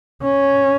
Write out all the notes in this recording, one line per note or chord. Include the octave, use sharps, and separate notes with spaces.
C#4